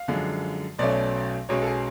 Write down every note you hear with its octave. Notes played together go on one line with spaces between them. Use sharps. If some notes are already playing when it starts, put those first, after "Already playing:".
Already playing: F5
F#2 D3 F3 G#3
B1 B2 F#3 A3 C#4 D5
B1 B2 G#3 C#4 C#5
A4
G#4